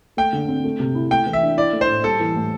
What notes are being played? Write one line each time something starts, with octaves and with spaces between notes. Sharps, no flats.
A3 G5
D3
C4
A3
C3
E4
A3 G5
E3
E5
D4
E4 D5
A3
C5
A2
G3 A4
E3
A2